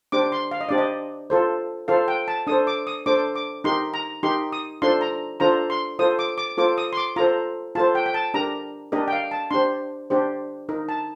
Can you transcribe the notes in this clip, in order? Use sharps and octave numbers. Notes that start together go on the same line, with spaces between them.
D4 G4 C5 D6
C6
F5
D#5
D4 G4 C5 D5
D#5
F4 A4 C5
F4 A4 C5 F5
G5
A5
D4 A4 C5 D#6
D6
D#6
D4 A4 C5 D6
D6
D#4 G4 A#4 C6
A#5
D#4 G4 A#4 C6
D#6
D4 F4 A4 C5 C6
A#5
D4 F4 A4 C5 A#5
C6
F4 A4 C5 D#6
D6
D6
F4 A4 C5 D6
D#6
C6
D6
F4 A4 C5 A#5
F4 A4 C5 A5
G5
G5
A5
D4 G4 A#4 A#5
D4 G4 A#4 D#5
G5
F5
A5
D4 G4 C5 C6
D4 G4 C5
D#4 A#4
A5